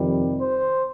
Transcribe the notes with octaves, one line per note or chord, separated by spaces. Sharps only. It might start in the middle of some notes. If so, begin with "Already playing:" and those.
Already playing: F2 C3 D#3 G3
C5